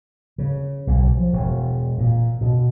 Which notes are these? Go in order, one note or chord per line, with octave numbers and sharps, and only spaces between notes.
C#3
B1
F3
E1
A#2
B2